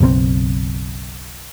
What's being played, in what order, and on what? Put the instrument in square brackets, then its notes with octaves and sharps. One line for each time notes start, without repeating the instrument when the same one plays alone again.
[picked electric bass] F#1 B1 A#2 C4